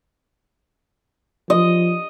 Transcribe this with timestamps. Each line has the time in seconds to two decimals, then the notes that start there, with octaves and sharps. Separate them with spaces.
1.50 F3 D#5